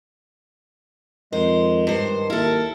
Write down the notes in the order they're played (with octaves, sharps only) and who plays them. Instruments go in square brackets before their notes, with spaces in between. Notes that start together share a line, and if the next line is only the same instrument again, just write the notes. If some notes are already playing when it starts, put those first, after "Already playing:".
[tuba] F2 [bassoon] D#3 [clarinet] G#3 [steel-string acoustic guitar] C5
[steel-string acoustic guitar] G2 C5 [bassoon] D#3
[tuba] D#2 [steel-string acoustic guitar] E4 A4 [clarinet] A#4